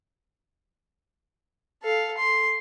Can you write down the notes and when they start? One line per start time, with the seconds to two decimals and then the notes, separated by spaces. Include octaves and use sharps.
1.82 A4 F5
2.17 C6